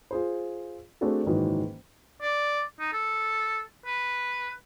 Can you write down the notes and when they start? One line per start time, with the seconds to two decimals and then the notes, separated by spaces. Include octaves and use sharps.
0.11 F4 G#4 C5
1.01 A3 C4 D4 F#4 G#4 A4
1.26 F#1 G#2 D#3 E3 F#3
2.22 D5
2.80 D#4
2.93 A4
3.86 B4